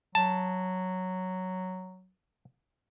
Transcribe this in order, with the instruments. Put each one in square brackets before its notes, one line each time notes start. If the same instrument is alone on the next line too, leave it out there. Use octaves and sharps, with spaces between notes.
[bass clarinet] F#3 [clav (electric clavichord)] A5